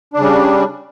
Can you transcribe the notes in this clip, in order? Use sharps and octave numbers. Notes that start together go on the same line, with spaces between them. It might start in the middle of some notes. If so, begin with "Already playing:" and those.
C#3 G3 D4